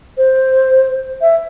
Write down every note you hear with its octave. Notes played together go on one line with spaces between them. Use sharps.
C5
E5